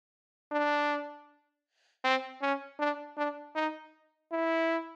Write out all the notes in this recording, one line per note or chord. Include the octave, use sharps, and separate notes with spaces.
D4
C4
C#4
D4
D4
D#4
E4